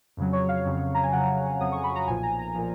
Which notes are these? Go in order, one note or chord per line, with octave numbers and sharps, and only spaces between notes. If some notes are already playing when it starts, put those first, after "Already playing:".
F2 C#3 F#3
C#5
F5
F2 C#3 F#3
A#5
G#5
F2 C#3 F#3 F#5
F2 C#3 F#3 D#6
C#6
B5
A#5
B1 A#2 F3 G#5
A#5
A#5
A#2 F3